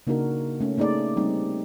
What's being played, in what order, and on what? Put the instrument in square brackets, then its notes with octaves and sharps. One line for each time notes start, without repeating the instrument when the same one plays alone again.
[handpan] C#3 A#3 D4 D#4 F#4 A#4
A3 C#4
A3 A#3 D#4 G#4 D5
G3 A3 C4 D#4